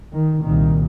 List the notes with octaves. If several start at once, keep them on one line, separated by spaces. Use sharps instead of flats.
D#3
C2 A#2 D#3